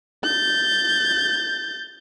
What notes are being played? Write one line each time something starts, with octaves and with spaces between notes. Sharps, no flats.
G6 A6